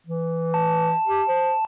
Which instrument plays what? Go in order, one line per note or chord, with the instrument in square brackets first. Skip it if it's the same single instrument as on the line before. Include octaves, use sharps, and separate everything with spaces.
[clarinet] E3
[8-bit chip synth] A5
[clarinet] G4
C5